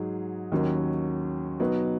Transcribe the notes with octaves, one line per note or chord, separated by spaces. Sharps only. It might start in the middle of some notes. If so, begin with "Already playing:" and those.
Already playing: G#2 F#3 D#4 G#4
D#2 D#3 F#3 C#4
B2 F#3 D#4 B4